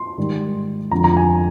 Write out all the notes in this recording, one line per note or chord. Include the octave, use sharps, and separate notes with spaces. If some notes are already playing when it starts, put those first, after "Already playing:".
Already playing: C6
G#2 D#3 G3
F2 D3 F3 A#5
A#5
G#5